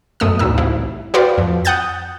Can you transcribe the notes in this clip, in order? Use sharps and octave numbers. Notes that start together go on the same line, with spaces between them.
F#2 B2 A3 D#6 E6
A1 D2 A2 D#4 E6
C2 E4
F#4 B4 C5 D5 F5 G5
F2
F#5 D#6 F#6 G6 A6